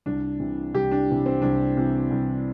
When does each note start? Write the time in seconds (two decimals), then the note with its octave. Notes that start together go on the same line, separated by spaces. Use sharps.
0.06 C2 D4
0.40 C3 E3
0.74 C2 G4
0.92 D4
1.09 C3 E3
1.26 C4
1.42 C2 D4
1.77 C3 E3
2.11 C2